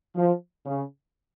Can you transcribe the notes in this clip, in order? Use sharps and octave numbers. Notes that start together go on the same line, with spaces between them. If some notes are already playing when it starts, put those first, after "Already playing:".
F3
C#3